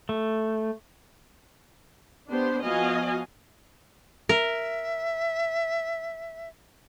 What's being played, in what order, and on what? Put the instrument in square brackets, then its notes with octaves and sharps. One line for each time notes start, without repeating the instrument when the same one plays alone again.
[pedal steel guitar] A3
[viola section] B3 D4 G4 C5
F3 B3 F#4 D#5 F5 G#5
[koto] A#4 [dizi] E5